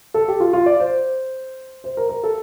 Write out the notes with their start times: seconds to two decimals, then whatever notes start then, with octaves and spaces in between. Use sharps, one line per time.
0.14 A4
0.28 G4
0.40 F4
0.53 F4
0.66 D5
0.80 C5
1.84 C5
1.97 A#4
2.09 A#4
2.24 A4